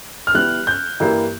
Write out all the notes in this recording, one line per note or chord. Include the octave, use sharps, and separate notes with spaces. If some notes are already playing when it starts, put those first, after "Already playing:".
F6
E3 G3 B3 F#6
G6
G2 E3 G3 A#3